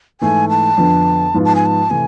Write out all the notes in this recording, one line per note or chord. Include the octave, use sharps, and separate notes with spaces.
G#2 E3 A3 G#5
A5
F2 D3 F3 B3
G#2 F3 B3 F4
A5
G#5
A5
C3 E3 A3 G#5